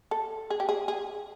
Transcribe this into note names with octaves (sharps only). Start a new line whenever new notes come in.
A4
G#4
G4
G#4
G#4